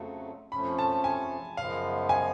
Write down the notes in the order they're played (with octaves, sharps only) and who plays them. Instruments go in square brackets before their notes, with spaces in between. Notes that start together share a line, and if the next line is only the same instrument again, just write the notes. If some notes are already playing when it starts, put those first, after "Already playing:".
Already playing: [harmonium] F2 C#3 F#3 A3
[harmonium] F2 F3 A3 C#4 [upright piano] B5
[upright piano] A5
G#5
[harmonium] F#2 C#3 F3 G#3 B3 [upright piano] F5
[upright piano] G#5